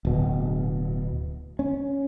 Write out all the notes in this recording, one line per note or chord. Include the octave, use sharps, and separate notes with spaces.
D1 B2
C#4